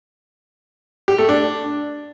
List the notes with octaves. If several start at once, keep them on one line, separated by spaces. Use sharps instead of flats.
G4
A3
D4